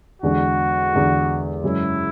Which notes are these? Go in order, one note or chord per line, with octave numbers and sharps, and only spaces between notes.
E2 D3 G#3 D4 F#4
E2 D3 G#3 D4
F#2 C#3 G#3 C#4 E4